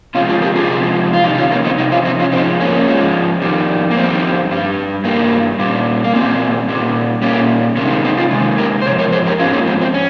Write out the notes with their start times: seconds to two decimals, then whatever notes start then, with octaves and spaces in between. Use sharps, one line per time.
0.15 C3 F3 G#3 C#4 F4
0.29 F4 G#4
0.42 G4 A#4
0.55 F4 G#4
0.70 C3 F3 G#3
1.13 F4
1.24 F2 C3 D#3 G3 D#4 G4
1.38 C#4 F4
1.51 A#3 C#4
1.65 C4 D#4
1.78 F2 C3 D#4
1.92 C#4 F4
2.05 C4 D#4
2.20 C#4 F4
2.32 G#2 F3 G#3 C4 D#4
2.60 A#3 C#4
2.88 G#2 F3 G#3
3.42 F2 D#3 G3
3.91 A#3
3.96 F2 D#3 G3 C4
4.51 G2 G3
5.04 G2 G3 A#3
5.59 A#2 G3
6.04 A#3
6.14 A#2 G3 C4
6.69 A#2 G3
7.22 A#2 G3 A#3 C#4
7.77 C3 D#3 G#3 A#3 C#4
7.90 C4
8.04 C4 D#4
8.18 C#4 F4
8.31 C3 D#3 G#3
8.58 G4 A#4
8.82 C5
8.86 G#2 F3 C#5
8.99 A#4 C#5
9.12 G#4 C5
9.27 G4 A#4
9.40 G#2 F3 G#3 C#4 F4
9.53 A#3 C#4
9.67 C4
9.81 C4
9.94 C#4